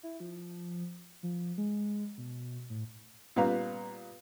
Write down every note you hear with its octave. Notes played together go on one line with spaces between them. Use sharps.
E4
F3
F3
G#3
B2
A2
A#2 G3 B3 B4 F5 A#5